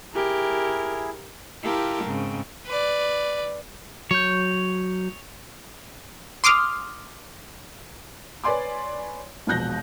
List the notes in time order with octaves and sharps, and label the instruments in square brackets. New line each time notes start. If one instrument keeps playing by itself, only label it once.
[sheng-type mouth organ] E4 G#4 [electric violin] G4 A#4
[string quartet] E4 F4 G4 A#4 G5 A5
G#2 C#3 C4
[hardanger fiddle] B4 D5
[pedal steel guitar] F#3 G6 [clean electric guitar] C#5
[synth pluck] C6 D6 D#6 F6
[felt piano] B4 C#5 D5 G#5 C6 D6
E1 A#1 B2 F#6 G6 A#6